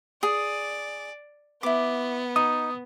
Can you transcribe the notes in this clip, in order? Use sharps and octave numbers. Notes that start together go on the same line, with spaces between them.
G#4 D5
B3 E4 D6
D#4 D#6